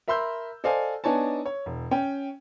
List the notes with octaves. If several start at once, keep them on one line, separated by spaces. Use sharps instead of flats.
A#4 E5 B5 C6 E6 G6
A4 C5 D5 D#5 F5 G#5
B3 D4 D#4 C#5 G#5 A5
C#5
E1
C#4 G5